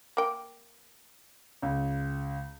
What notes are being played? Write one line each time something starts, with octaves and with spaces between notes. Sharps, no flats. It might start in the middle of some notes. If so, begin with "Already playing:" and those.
A#3 G5
C#2